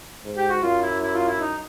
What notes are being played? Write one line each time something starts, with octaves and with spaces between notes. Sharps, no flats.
G#2
G4
F#4
F#2 F4
E4
E4
F4
E4
D#4